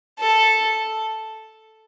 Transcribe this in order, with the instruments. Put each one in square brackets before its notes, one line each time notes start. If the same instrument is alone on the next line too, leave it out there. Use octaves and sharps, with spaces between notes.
[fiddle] A4